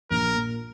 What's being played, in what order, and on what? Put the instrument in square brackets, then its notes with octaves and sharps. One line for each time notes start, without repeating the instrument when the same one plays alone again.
[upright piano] A#1 [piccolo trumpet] A#4
[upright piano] A#2 A#3